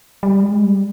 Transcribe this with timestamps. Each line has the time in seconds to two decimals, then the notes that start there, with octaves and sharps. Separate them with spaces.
0.23 G3
0.42 G#3
0.61 G3